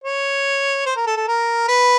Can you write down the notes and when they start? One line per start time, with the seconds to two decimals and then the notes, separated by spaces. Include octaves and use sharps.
0.04 C#5
0.86 C5
0.96 A#4
1.06 A4
1.16 A4
1.27 A#4
1.68 B4